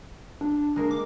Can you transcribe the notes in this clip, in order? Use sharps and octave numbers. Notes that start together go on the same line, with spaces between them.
D4
G#3 A#3 D4 A#4
D6